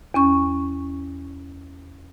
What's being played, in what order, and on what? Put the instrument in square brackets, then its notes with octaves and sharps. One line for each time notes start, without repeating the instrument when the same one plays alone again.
[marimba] E2 C#4 C#6